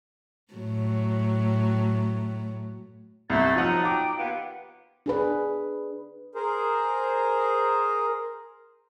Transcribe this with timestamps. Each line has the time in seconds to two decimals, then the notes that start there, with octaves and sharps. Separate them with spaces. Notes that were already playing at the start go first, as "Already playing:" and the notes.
0.53 A2 F#3
3.30 C2 A3 D#4 E4 A6
3.56 F3 F#3 D#4 F#5
3.85 G5 D6
4.17 D#2 B3 F4
5.06 D4 G#4 B4
6.35 G#4 A#4 C5